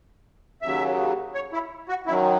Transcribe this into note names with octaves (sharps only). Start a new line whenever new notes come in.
D#2 C#3 F#3 E5
C#5
E4
F#4
F#2 D#3 F#3 E4